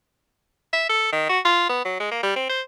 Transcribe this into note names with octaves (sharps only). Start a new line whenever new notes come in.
E5
A4
D#3
F#4
F4
B3
F#3
G#3
A#3
G3
C4
C5